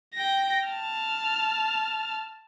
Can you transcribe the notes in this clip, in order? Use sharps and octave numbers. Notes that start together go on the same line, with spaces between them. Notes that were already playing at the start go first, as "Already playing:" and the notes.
G5 A#6
A5 F6